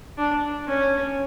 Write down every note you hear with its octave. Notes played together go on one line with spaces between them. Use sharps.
D4
C#4